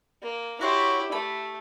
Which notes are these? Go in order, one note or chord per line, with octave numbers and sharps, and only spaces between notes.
A#3
E4 F#4 G4 C#5 C6
A3 B5